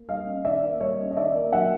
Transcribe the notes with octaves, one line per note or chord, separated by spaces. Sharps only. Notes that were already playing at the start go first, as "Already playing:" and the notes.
Already playing: A#3
G3 D#5 F5
C#4
D#3 D5 E5
A#3
G3 C#5 D#5
C#4
D#5
D#3 D5 E5
A#3
F#3 E5 F#5